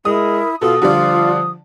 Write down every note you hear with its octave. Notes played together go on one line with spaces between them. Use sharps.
G#3 E4 A#4 D#6
B2 F4 A4 D#6
D3 F3 G3 F4 D5